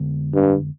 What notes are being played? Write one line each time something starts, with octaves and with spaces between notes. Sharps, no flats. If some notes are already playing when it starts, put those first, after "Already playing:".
Already playing: F2 D3 G#3 B3
G2